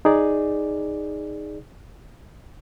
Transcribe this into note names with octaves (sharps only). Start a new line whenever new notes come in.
D#4 G#4 D5